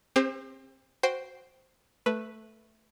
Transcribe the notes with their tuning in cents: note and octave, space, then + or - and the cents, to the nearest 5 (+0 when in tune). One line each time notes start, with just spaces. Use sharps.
C4 +30 G4 +45 C5 -5
F#4 +0 C5 +0 G5 +0
A3 +0 B4 +0